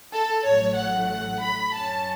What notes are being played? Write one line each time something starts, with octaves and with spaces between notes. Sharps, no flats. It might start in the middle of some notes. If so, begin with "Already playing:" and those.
A4
A1 A2 F#3 A3 C#5
F#5
F#5
B5
F#2 F#3 C#4 A5